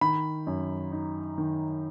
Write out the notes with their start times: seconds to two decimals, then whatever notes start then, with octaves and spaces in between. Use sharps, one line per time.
0.01 D#3 B5
0.47 F#2
0.92 D#4
1.38 D#3